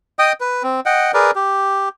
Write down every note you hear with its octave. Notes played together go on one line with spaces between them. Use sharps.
D#5 G5 D#6
B4
C4
D#5 F#5 G5
G#4 A#4 B4 D5
G4